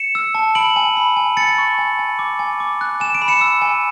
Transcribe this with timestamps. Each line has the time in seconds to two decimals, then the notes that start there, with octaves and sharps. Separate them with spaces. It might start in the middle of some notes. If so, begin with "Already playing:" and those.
Already playing: C#7 E7
0.15 E6
0.35 A5
0.55 B5 D7 F#7
0.76 G#5
0.97 B5
1.16 G#5
1.37 G#5 A6 C#7
1.58 C#6
1.78 G#5
1.99 G#5
2.19 D6
2.39 G#5
2.60 D6
2.81 F#6
3.00 G#5 E7
3.15 D7
3.22 B5
3.28 C#7 E7
3.41 E6
3.62 G#5